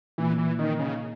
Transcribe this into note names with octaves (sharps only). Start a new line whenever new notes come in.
A#2 E3
E3
D#3 D#4
C#3